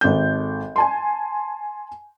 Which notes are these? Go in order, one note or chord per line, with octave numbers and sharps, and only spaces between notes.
G#1 A4 G6
G#5 A5 C6